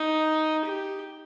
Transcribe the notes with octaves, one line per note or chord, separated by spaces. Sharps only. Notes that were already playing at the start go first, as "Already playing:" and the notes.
Already playing: D#4
G4